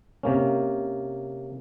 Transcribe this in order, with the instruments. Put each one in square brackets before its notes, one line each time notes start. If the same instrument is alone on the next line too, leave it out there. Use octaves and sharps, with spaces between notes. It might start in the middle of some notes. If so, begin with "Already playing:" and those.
[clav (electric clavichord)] C3 A#3 C#4